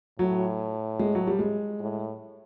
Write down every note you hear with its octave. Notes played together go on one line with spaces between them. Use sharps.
A2 F#3
G#3
F#3
G3
G#3
A2